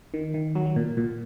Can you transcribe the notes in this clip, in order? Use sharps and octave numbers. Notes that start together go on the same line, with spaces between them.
D#3
D#3
F#3
F#3
A#2
A#2